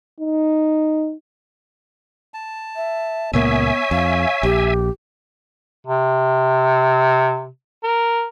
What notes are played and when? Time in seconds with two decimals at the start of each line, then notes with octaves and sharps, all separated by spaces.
0.21 D#4
2.34 A5
2.76 E5
3.33 C#2 A#2 A#3 B3 C#5 E5 G#5
3.91 F2 F5
4.43 A#1 G4
5.87 C3
7.84 A#4